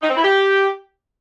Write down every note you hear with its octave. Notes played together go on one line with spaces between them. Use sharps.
D#4
C4
E4
G4